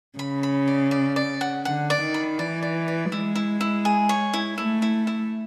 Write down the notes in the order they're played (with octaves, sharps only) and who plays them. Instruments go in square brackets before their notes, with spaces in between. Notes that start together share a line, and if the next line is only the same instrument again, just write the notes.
[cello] C#3 [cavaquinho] B5
[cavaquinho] B5
D5
D5
D5
F#5
[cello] D3 [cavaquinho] F#5
[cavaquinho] D5
[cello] D#3
[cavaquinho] B5
[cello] E3 [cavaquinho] D5
[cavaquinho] D5
D5
[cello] G#3 [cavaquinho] E4
[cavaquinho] E4
E4
G#4
C#5
E4
[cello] A3 [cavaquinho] E4
[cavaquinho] E4
E4